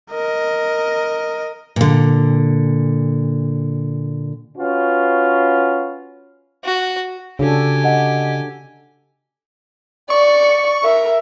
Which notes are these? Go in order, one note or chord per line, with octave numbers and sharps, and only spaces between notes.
A#4 D#5
A#2 D3
C#4 F4 F#4 B4
F#4
C#3 D4 F#4 G4 A4 G#5
D#5 F#5
D5 C#6
A#4 E5